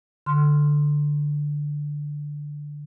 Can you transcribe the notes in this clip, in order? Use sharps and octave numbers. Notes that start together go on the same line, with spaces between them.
D3 C6 F6